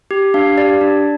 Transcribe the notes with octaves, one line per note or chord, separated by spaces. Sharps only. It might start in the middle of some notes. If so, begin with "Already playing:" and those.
G4
D4 F5
G4 D5
D4